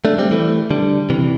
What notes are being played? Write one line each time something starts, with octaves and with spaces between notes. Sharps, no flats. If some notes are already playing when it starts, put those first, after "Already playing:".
A3 D4
G3 C4
E3 A3
D3 G3
C3 E3